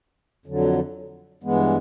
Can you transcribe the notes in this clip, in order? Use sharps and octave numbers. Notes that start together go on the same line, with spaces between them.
F2 D3 F#3
G2 E3 G#3 B3